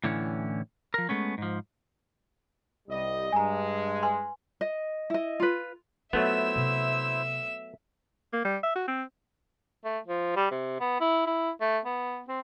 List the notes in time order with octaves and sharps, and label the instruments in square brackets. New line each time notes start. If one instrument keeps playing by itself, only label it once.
[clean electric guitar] A2 D3 E3 C#4
F3 A#4
G#3 A3 B3 C#4
G#2 F3
[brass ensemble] C2 G3 D#5
[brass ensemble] G2 G#3 [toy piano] G#5 A#5
[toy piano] B4 G#5 C6
[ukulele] D#5
E4 D#5
F4 B4
[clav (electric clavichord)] F#3 A3 B3 [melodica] E4 C5 [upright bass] F4 [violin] E5 E6
[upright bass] C3
[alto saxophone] A#3
G3
E5
F#4
C4
[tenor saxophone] A3
F3
G3
C3
B3
E4
E4
A3
B3
C4